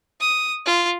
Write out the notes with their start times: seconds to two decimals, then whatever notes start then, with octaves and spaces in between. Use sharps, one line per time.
0.20 D#6
0.65 F4